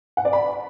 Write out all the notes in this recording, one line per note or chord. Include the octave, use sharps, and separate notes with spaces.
F#5
D5
B5